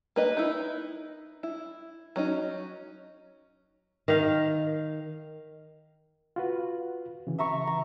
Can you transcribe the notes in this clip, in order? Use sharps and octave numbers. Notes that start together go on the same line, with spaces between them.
A#3 B4 D#5
D#4 E4
E4
F#3 C#4 D#4
D#3 F5
F4 F#4 B4
C#3 E3
E5 A#5 C#6
A#5